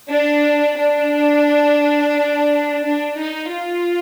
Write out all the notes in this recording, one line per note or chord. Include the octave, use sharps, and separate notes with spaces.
D4
D4
D4
D#4
F4